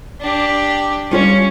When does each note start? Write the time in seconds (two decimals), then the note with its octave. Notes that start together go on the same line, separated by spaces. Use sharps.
0.22 D4 G4
1.11 G3 C#4 F4 C#5